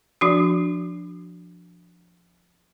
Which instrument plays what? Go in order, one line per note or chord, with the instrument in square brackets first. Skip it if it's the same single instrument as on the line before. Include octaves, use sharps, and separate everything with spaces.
[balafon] F3 D4 F#4